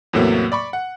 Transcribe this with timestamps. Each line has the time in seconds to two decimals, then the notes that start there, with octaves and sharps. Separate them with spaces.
0.13 E2 A2 C3 F#3 A#3 B3
0.52 D5 B5 C#6
0.73 F#5